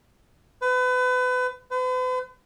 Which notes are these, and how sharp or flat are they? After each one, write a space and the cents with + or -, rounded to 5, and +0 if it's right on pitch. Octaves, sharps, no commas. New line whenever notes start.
B4 +30
B4 +45